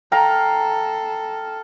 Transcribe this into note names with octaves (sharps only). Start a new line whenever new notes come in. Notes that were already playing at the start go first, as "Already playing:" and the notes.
A4 F5 G5 A#5